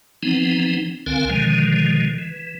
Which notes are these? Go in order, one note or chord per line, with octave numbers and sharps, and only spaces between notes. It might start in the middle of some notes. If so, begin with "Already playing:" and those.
E3 F3 B3 C4 D#4
C2 D3 C4 A#4 F5 G#5
B2 D3 D#3 F3 G#3
E3